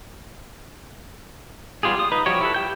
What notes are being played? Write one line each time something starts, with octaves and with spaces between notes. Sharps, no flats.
G3 B3 F4 G4 G#4
D#6
D#4 B4
F3 G3 F#4 G4 C#5
E4 A4 B4
G4 G5 G6